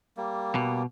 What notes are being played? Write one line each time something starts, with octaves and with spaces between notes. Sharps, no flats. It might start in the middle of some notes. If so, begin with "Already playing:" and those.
G3 A#3
B2